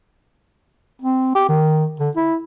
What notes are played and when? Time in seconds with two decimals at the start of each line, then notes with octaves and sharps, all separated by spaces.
1.02 C4
1.35 G4
1.49 D#3
2.00 D3
2.16 E4